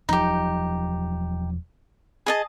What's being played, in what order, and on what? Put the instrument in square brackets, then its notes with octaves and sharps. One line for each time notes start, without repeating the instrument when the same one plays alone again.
[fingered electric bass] E1 F3 F#3 [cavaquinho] D#4 G4
[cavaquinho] G#4 D#5 A5